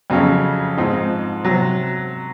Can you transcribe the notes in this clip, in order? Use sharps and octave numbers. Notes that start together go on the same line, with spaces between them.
F2 C#3 F#3 C#4
G#2 F3 C4 D#4
C3 F#3